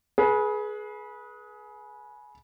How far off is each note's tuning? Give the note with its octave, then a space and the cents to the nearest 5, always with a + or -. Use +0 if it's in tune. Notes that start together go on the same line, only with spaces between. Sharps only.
G#4 +20 B4 -25